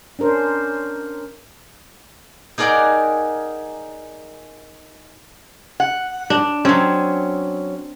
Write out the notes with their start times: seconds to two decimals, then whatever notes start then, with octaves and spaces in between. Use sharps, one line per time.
0.19 C#4 D4 A#4 C5
2.58 D#4 G#4 A#4 D5 F#5 G5
5.80 F#5
6.30 D4
6.65 F#3 C4 C#4